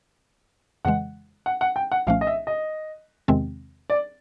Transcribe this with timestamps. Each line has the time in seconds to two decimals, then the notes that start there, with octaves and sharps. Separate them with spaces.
0.85 F2 C#3 E3 G#3 F#5
1.46 F#5
1.61 F#5
1.76 G5
1.92 F#5
2.07 C2 A#2 F3 A3 C#4 F5
2.21 D#5
2.27 E5
2.47 D#5
3.28 E2 C3 D#3 G#3 C4
3.90 D5